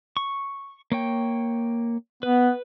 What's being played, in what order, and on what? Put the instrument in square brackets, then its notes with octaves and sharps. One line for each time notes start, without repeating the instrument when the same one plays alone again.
[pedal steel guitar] C#6
A#3 C#5 G5
[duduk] B3 [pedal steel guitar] B4